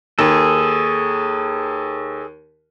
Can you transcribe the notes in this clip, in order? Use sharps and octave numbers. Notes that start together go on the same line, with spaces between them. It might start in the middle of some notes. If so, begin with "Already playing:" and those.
D#2 G#4 A4